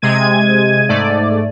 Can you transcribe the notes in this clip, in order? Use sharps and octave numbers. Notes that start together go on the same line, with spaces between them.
C3 G#3 G#6 D#7
G#2 A3 D5